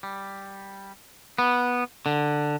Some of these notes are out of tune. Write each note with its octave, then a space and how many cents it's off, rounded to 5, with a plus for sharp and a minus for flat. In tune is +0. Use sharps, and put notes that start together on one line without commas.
G3 +0
B3 -10
D3 +10